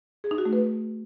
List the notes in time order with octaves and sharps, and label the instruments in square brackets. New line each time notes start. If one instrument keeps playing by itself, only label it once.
[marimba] G#4
D#4
F#4
A3
B4